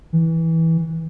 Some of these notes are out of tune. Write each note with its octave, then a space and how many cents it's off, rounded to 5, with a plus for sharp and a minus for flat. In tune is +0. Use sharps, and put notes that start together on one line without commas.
E3 -15